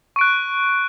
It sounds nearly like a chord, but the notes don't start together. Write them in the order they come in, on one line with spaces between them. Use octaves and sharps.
C#6 D7 F#6